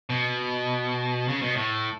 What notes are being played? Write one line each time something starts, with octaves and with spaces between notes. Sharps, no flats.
B2
C#3
B2
A2